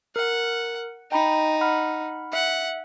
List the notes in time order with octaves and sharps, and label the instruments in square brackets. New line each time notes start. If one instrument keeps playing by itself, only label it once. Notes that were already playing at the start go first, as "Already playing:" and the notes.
[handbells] A#4 [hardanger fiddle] F#5
[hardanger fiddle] D#4 [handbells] G5 A#5 B5
[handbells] F#5 B5 F6
[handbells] E5 [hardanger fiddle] F#5